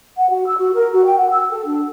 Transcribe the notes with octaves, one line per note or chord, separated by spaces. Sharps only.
F#5
F#4
E6
F#4
A#4
F#4
G5
F#5
E6
A4
D4